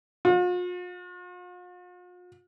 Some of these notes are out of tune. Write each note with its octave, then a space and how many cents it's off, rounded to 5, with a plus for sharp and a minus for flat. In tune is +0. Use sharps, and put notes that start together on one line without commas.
F4 +45